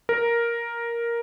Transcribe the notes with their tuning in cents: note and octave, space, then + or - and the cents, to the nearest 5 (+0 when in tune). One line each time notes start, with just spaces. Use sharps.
A#4 +5